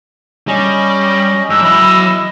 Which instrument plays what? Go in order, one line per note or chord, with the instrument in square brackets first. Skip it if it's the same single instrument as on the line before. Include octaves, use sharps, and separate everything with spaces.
[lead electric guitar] G3 [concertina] C#4 D#5
[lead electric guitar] G#2 [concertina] D4 [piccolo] E6
[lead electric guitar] F#3 B5 [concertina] E4 D#5